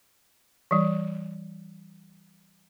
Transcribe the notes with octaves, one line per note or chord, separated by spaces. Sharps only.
E3 G3